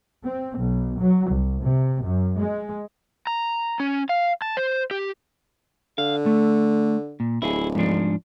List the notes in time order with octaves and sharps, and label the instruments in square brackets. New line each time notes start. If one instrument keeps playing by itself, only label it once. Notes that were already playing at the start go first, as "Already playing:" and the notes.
[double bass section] C4
B1
F#3
C2
C3
F#2
G#3
[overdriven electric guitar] A#5
C#4
F5
A5
C5
G4
[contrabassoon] D3 [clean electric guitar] F5
[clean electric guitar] A3
A#2
[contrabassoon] D1 [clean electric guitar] E4 G#4
[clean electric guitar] G#2 F3 D4